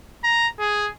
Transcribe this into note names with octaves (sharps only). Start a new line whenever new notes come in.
A#5
G#4